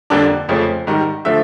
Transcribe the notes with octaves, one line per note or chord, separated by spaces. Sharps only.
F2 D3 G3 A#3 D4
F2 C#3 F3 A3
G#2 D#3 G3
D3 F3 A3 E5